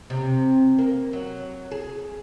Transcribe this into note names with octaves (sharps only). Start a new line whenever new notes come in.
C3
A#3
F#3
G#4